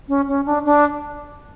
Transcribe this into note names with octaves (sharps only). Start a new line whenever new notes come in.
C#4
C#4
D4
D4